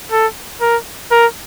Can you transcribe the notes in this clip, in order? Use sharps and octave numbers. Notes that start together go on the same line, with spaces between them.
A4
A#4
A#4